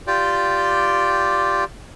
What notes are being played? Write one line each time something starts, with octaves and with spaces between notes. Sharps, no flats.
F4 G4 D5 G5